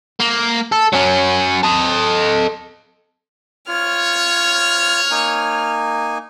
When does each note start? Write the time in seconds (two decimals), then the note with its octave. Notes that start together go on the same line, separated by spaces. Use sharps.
0.20 A#3
0.72 A4
0.93 F#3 C#4
1.63 A4 D#5
3.68 F4 C#5 F6
5.11 A#3 D#4 G#5